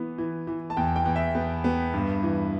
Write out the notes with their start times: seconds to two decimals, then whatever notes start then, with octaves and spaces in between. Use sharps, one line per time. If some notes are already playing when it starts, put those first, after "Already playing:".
Already playing: E3 B3
0.18 E3
0.47 E3
0.70 A5
0.77 E2 G5
0.96 G5
1.06 E2
1.16 E5
1.35 B3
1.64 B3
1.94 G2
2.23 E3